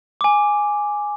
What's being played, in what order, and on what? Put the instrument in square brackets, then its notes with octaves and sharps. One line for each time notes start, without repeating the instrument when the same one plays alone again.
[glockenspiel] G#5 D6